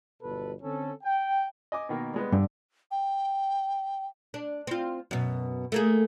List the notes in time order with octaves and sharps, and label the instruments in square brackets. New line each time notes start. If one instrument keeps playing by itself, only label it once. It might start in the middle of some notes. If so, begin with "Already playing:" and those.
[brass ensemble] G1 B2 A4 B4
D3 C4 C#4 A4
G5
[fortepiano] D#5 G#5 D6
B2 D#3 A#3
G3 G#3 B3
[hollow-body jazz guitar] G2 [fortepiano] D3
[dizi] G5
[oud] D4
C4 F4
F#2 B2
A3 A#3 G#4